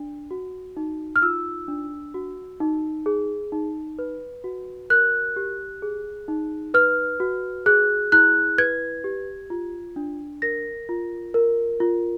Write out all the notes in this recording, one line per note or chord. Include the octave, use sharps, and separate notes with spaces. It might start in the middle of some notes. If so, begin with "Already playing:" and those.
Already playing: D4
F#4
D#4
F6
F4 E6
D4
F#4
D#4
G#4
D#4
B4
F#4
A#4 F#6
G4
G#4
D#4
B4 F6
F#4
G#4 F#6
E4 F#6
B4 G#6
G4
F4
D4
A#4 A#6
F4
A#4
F4